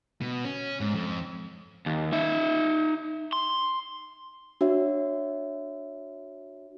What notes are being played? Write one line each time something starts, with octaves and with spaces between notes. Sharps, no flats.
B2
C#4
G#2
F2
D#2
D#4 E5
C6
D4 F#4 C#5 E5